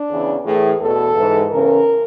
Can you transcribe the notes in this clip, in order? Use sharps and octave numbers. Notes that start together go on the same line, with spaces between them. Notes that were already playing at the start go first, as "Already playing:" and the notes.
Already playing: D4
E2 C#3 E3
A2 E3 G#4
E2 B2 A4
G#2 E3
E2 C#3 E3 A#4